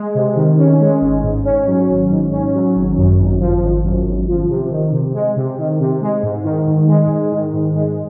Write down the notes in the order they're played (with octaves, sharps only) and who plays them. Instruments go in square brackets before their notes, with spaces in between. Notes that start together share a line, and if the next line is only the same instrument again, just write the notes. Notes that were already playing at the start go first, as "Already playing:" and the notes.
Already playing: [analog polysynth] G#3
C3
D#3
C#4
G#3
G#1
G#2
C#4
F#3
G#1
G#2
C#4
F#3
G#1
F#2
G#1
F3
G#1
F#2
G#1
F3
C3
D#3
C3
G#3
C3
D#3
C3
G#3
G#2
D#3
G#2
G#3
G#2
D#3
G#2
G#3